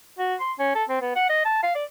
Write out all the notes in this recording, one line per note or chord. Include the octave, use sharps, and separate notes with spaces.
F#4
C6
C#4
A4
C4
B3
F#5
D#5
A5
F5
D5